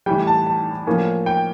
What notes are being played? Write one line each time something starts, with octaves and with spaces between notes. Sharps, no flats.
A2 E3 G3 G5
A5
A5
A2 F3 A#3 C#4
G5